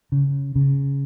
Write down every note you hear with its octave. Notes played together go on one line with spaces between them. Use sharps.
C#3
C#3